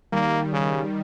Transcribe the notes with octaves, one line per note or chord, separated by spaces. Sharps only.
D#3 G3 A#3
C#3